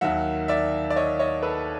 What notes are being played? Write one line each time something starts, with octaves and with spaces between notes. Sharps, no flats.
D#2 D#3 F#3 E5 F#5
D5 E5
D5
C#5 D#5
C#5 D#5
A4 B4